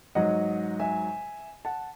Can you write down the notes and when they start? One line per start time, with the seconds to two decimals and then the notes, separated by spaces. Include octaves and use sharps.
0.15 G#2 F#3 D#5 F#5
0.80 E5 G#5
1.65 F#5 A5